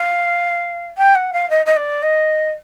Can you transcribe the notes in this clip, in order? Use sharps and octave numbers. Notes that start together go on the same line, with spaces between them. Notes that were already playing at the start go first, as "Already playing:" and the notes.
Already playing: F5
G5
F#5
F5
D#5
D#5
D5
D#5